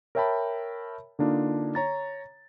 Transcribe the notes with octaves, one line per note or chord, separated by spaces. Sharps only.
A#4 C#5 E5 G5 A5 B5
D3 A#3 D4 D#4 F4
C#5 A#5 A6